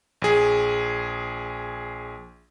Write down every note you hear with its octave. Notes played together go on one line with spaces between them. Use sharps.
A#1 G#4